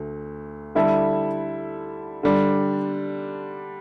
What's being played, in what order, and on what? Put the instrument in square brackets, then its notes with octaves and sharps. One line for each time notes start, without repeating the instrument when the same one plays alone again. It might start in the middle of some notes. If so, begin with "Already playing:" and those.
Already playing: [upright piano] D2 A3
D3 G3 E4 A4 E5
D3 G3 D4